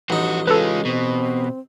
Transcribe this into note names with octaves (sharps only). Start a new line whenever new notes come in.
A1 F3 D#4 F#4
G#3 C#4 F4 A4 B4
B2 C4